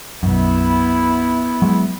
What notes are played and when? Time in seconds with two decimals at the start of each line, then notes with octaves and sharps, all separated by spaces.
0.23 B1 F#2 B3 E4
1.62 F#3 G#3